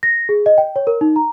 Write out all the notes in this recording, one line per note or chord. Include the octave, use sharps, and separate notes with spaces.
A#6
G#4
D#5
G5
C#5
A#4
D#4
A#5